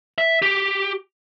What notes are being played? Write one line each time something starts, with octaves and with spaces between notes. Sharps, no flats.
E5
G4